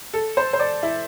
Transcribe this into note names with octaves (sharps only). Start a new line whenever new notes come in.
A4
C5
C5
D5
E4